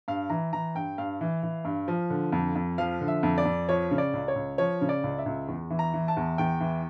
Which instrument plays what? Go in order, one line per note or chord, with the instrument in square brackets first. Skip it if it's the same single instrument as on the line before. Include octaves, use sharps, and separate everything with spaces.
[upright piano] G2 F5
E3 A#5
E3 A#5
G2 G5
G2 F5
E3
E3
G2
F3
D3
F2
F2
F3 F5
D3
E5
F2
D5
F2
F3 C#5
C#3
D5
C#2
C#5
C#2
F3 C#5
C#3
D5
C#2
E5
C#2
E2
E3
A#5
E3
A5
E2
E2 G5
E3